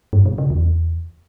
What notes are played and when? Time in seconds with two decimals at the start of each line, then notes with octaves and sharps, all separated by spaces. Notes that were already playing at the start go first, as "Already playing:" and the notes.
0.13 G2
0.26 B2
0.38 C#3
0.50 E2